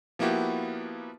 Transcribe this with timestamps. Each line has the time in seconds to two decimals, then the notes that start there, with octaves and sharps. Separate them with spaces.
0.19 F3 A#3 B3 E4 F#4 G4